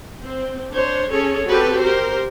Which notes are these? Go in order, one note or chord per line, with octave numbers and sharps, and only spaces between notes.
C4
D4 C5 C#5
C#4 G#4 A4 C#5
C4 F#4 G4 A4 B4
G4 A#4 C5